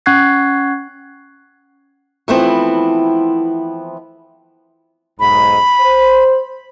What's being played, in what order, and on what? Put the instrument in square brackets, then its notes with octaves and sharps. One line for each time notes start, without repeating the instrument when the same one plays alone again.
[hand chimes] C#4 F#5 C#6 F#6 G#6 C7
[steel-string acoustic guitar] E3 F3 A3 B3 C4 E4
[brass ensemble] B1 G#2 [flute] B5
[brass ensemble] C5